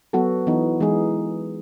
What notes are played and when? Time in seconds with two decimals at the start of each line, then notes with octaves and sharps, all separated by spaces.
0.13 F#3 B3 F#4 A4
0.47 E3 B3 D#4
0.80 E3 G#3 D#4 G#4